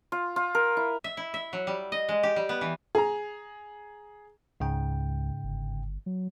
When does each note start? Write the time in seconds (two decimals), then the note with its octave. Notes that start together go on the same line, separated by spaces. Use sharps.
0.12 F4
0.36 F4
0.55 A#4
0.77 E4
1.04 E5
1.17 E4
1.34 E5
1.53 F#3
1.67 G3
1.92 D#5
2.09 G#3
2.23 G4
2.36 G3
2.49 B3
2.61 E3
2.95 G#4 A#5
4.60 C#2 G#2 C#3 G5
5.44 G1
6.06 F#3